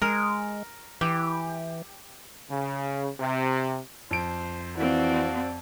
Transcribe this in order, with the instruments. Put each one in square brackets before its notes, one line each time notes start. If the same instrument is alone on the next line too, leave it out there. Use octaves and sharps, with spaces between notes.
[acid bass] G#3 [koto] A#4
[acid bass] E3 [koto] G4
[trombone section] C#3
C3
[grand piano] F2 D7 [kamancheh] C5
[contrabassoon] E3 [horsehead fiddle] C4 D5 [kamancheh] F#4 F5